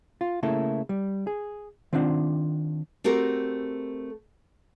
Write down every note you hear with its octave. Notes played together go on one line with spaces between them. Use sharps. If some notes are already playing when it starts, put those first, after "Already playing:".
F4
C#3 A3 A#3 E4 A4
G3
G#4
D#3 C4 D4 F4 F#5
A3 C4 F#4 G4 A#4